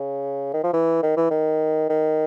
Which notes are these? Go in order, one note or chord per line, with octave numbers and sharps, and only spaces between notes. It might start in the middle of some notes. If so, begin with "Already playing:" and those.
Already playing: C#3
D#3
F3
E3
D#3
E3
D#3
D#3